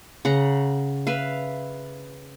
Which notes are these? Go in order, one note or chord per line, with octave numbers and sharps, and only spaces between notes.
C#3 F#5 A#5
B4 E5 F5